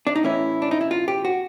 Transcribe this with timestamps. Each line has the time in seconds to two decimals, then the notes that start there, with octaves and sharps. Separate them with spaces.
0.07 D4
0.15 D#4
0.23 A2 E3 A3 C#4 E4
0.62 D4
0.71 D#4
0.81 E4
0.91 F4
1.08 G4
1.25 F#4